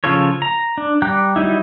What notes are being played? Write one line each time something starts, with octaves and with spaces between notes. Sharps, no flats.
C#3 F3 F4 A4 C#5
A#5
D4
G3 G5 A#5 D6 F#6
F#3 G3 D#4 E4